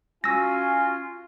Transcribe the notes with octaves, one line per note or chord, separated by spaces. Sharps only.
C#4 F4 F#4 G#5 E6 A#6